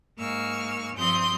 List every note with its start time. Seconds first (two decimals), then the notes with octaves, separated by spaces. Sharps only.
0.17 G#2 A#3 C#6 E6 F6
0.95 G2 F3 C4 C6 D#6 G6